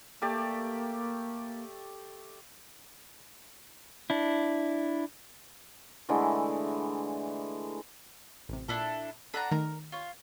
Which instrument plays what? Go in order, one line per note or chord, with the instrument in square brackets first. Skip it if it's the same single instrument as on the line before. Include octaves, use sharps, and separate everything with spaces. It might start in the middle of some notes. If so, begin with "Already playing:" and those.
[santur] A3 G4 D5 [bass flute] A#3
[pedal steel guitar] D4 E4
[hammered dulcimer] D3 E3 G#3 A3
[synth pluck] A1 C3
[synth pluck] A#2 [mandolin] D4 E4 A4
[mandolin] D4 F#5 A#5 [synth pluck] A4 B5 D#7
[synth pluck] D#3 A3 A#5 [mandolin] A#4
[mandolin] F4 C#5